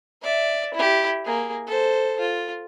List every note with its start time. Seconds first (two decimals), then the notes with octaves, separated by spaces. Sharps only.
0.22 D5 E5
0.74 E4 G4
1.25 A#3 G#4
1.66 A4 C5
2.19 F4